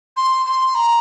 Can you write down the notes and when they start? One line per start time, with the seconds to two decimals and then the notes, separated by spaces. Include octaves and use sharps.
0.17 C6
0.46 C6
0.75 A#5